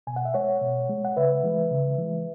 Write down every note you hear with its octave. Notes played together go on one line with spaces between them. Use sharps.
B2 G#5
F#5
E5
G#3 C#5 F#5
B2
G#3
F#5
C#3 B4 E5
E3 G#3
C#3
E3 G#3